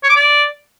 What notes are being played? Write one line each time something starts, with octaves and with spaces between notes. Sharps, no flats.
C#5
D6
D5